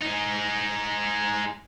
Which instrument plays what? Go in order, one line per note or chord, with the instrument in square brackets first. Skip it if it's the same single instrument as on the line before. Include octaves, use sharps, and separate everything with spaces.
[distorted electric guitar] G#3 D#4